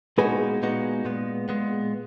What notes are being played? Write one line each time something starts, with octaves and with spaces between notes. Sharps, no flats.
A#2 G#3 B3 D#4 F#4 G#4 B4
A#2 G#3 B3 D#4 F#4
A#2 G#3 B3
A#2 G#3 B3